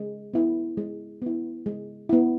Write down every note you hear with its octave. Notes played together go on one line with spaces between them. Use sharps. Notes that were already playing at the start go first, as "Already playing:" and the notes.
Already playing: G#3
B3 E4
G#3
B3 E4
G#3
B3 E4